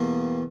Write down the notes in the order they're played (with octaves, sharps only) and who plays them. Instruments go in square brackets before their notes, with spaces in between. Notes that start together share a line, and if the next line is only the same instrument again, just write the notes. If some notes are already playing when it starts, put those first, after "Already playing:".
Already playing: [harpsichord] E2 B2 G3 A#3